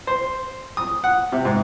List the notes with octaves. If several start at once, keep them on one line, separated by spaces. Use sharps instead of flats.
C5
D#6
F#5
C3
G#2